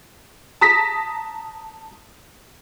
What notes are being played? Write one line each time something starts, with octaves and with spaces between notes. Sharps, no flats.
A5 A#5 D#6 A#6 B6